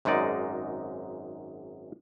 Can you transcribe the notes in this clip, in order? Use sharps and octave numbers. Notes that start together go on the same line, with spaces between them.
G#1 F#2 G#3 D#4 D5